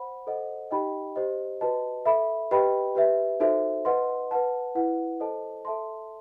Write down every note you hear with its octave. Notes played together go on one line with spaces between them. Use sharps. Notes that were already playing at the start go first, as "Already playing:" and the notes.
Already playing: C5 F#5 B5
A4 C5 D#5 F#5
D#4 G4 D#5 G5 B5
G4 C5 D#5
F#4 B4 D#5 A5
A4 E5 B5
G4 B4 D#5 G5 B5
G4 B4 E5
D#4 F#4 A4 C5 E5
B4 D#5 F#5 C6
B4 F#5 A5
E4 B4 F#5
A4 C5 D#5 A5
A4 E5 A5 C6